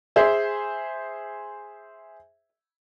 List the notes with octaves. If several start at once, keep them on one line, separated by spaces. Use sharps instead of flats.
G#4 C5 E5